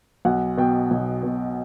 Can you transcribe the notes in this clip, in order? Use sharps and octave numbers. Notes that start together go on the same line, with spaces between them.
B1 F#5
B2 G5
B1
B2